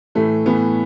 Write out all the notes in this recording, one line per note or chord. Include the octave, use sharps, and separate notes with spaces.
A2 E3 A3
A2 E3 B3